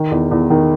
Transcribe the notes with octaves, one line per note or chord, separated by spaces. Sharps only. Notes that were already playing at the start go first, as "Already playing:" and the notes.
Already playing: D#3
E2
E2
D#3